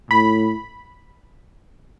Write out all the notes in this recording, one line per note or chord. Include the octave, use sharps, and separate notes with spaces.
A2 B5